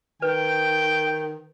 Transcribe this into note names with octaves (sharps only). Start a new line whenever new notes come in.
D#3 B4 G5